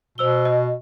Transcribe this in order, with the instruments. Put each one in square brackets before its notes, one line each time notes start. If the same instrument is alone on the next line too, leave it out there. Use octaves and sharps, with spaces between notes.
[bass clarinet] B2 [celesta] C5 E6 G7
[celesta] D#5